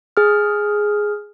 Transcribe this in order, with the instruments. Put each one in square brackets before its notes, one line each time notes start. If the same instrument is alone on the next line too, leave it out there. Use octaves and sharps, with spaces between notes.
[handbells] G#4 F6